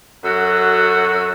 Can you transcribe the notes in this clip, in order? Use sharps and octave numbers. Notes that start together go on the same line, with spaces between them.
F#2 F#4 A4